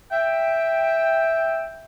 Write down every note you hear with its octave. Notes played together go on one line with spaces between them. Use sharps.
E5 G5